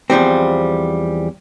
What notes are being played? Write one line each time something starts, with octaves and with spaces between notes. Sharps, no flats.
E2 F3 G3 C4